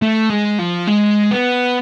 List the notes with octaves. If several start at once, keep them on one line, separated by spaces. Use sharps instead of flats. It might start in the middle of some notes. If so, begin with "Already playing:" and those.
A3
G#3
F3
G#3
B3